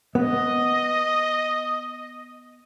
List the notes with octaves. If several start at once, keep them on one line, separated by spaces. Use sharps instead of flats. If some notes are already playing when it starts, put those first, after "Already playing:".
B3 D#5